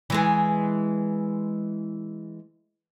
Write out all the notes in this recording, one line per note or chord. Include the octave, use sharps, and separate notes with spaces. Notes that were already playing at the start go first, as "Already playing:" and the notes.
E3 G#3 G#4